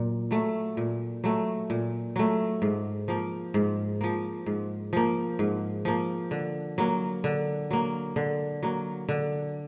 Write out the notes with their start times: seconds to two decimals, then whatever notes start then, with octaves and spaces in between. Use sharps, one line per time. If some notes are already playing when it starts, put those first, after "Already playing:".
Already playing: A#2 F#3
0.31 F#3 A3
0.77 A#2
1.24 F#3 A3
1.70 A#2
2.16 F#3 A3
2.62 G#2
3.08 F3 A#3
3.54 G#2
4.01 F3 A#3
4.46 G#2
4.93 F3 A#3
5.39 G#2
5.85 F3 A#3
6.31 D3
6.78 F#3 A#3
7.24 D3
7.71 F#3 A#3
8.16 D3
8.63 F#3 A#3
9.09 D3